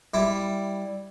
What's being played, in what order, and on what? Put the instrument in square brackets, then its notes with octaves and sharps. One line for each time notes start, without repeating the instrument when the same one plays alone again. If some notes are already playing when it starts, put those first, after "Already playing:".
[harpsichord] G3 E4